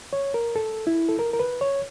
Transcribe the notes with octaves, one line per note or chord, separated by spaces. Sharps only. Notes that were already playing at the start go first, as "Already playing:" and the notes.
C#5
A#4
A4
E4
A4
A#4
A#4
B4
C#5